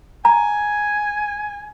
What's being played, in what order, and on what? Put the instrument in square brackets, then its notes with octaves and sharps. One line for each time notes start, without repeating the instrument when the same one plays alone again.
[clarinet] G#5 [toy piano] A#5